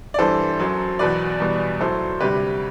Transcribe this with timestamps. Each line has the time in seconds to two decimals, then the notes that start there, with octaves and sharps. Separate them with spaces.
0.14 D5
0.19 G2 E3 G3 A4 C5
0.59 F#2 F#3
0.99 E2 B2 F#3 B4 D5
1.40 E2 B2 G3
1.80 A2 F#3 A4 C5
2.20 D2 C3 G3 G4 B4